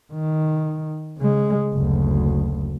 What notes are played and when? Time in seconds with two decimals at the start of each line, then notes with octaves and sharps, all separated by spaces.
0.13 D#3
1.18 C#3 G#3
1.74 F#1 D2